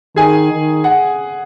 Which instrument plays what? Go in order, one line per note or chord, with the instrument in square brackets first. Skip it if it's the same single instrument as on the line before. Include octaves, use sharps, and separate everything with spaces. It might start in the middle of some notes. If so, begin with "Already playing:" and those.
[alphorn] D#3 [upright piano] G#4 G#5
[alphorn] D#3
[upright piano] F#5